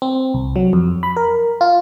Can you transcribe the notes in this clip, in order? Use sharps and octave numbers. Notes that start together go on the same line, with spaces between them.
C4
C2
F#3
F2
B5
A#4
F4